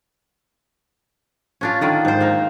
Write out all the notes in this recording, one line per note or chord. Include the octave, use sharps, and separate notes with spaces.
C#4 D4 F4
D3 D#3 D4
G#2 C5
A#3 D#4